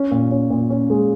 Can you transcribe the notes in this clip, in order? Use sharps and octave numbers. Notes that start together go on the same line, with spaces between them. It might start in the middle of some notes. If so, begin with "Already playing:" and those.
Already playing: C#4
A#2
C#4
A#2
C#4
G#3